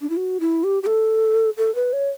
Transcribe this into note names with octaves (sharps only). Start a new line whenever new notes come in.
D4
E4
F#4
E4
G4
G4
A4
A4
B4
C#5